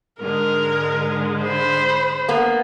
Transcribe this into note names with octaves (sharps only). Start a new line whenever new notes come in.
G#2 D3 G#3 A#4
C5 B5
A#3 B3